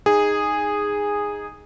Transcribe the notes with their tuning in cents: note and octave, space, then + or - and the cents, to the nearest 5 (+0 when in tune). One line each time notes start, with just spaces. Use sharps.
D#4 +0 G#4 -10